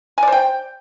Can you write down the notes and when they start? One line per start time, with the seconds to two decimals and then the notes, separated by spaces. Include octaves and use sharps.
0.18 G#5
0.23 D5
0.27 C5
0.32 G5